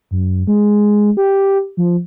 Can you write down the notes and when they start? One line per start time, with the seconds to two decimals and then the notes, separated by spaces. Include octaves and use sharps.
0.11 F#2
0.47 G#3
1.17 G4
1.77 F3